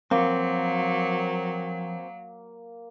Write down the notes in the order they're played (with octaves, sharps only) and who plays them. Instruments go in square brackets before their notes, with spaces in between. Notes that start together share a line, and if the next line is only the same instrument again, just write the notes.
[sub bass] F3 [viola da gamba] F#3 [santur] A#3 [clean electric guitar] C4